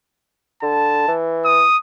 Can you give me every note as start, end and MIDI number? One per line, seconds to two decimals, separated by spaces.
0.62 1.08 50
0.62 1.15 81
1.08 1.64 52
1.45 1.77 87